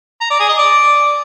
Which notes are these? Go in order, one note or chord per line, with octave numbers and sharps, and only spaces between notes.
A#5
D5
G#4
D#5
D5